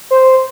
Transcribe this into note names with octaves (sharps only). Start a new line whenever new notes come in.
C5